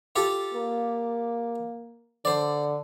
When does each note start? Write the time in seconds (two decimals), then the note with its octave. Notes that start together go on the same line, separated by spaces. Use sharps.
0.16 F4 G4 A4
0.54 A#3
2.25 D3 C5 D5